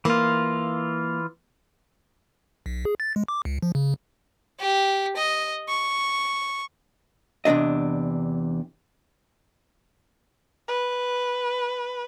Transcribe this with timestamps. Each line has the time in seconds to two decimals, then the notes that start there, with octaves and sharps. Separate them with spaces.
0.05 E3 A#3 F4
2.66 B1
2.85 G#4
3.00 A6
3.16 G#3
3.28 D6
3.45 C#2
3.62 F3
3.75 C#3
4.60 G4
5.17 D#5
5.69 C#6
7.45 E2 C3 F#3 D4 D#5
10.69 B4